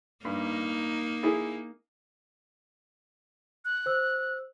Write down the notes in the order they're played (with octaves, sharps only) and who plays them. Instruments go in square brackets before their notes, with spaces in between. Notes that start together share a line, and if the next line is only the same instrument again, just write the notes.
[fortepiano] G2 [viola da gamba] A#3 D#4
[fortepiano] E4 G#4
[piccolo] F#6
[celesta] C5 E6